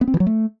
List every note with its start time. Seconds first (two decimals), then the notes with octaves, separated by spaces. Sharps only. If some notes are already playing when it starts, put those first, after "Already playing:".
0.01 B3
0.08 C4
0.14 E3
0.20 F#3
0.26 A3